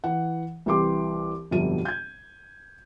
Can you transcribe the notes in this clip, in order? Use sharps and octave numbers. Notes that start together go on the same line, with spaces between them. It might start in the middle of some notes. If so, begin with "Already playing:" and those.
E3 F#5
C2 E3 G4 C6 D6
G1 F2 B2 F#3 G3 D#7
G6 G#6